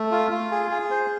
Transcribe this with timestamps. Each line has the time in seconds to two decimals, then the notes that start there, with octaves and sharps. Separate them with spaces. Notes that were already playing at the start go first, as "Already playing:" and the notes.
Already playing: A3
0.12 F4
0.31 F4
0.51 G#4
0.71 G#4
0.91 C5